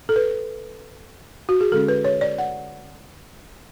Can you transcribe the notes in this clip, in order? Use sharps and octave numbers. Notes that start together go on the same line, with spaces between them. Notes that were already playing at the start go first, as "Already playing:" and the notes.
A4
B4
F#4
G#4
D3 G#3 C#4 A4
B4
C#5
D5
F#5